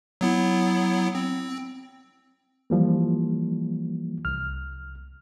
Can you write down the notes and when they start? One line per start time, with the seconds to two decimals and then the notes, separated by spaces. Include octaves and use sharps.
0.21 F#3 B3 E4
1.15 C4
2.70 E3 F3 G3 A#3
4.25 C2 F6